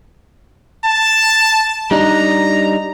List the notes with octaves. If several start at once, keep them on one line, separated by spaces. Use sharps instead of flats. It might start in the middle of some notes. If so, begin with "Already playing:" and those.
A5
G3 D4 D#4 A#5